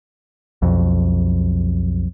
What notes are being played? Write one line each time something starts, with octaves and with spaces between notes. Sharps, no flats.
B1 F2